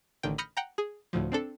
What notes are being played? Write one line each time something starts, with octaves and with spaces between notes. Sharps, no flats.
A1 D3 D#3 G5
B5 D#6 F6 G6 A#6 C#7
F#5 G5 A#5
G#4
D2 A2 F3
C4 D4 A4